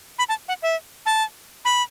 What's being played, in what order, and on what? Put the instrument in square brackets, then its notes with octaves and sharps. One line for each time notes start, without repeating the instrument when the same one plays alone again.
[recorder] B5
A5
F#5
E5
A5
B5